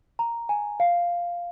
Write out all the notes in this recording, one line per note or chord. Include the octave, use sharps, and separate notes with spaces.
A#5
G#5
F5